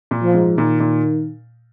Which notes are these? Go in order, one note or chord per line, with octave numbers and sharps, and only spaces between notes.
A#2
F3
G#2
A#2 D#3
A#2